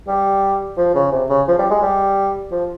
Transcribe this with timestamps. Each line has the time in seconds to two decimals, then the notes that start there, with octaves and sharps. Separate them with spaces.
0.07 G3
0.77 F3
0.95 C#3
1.12 C3
1.29 C#3
1.48 F3
1.59 G3
1.70 G#3
1.82 G3
2.52 F3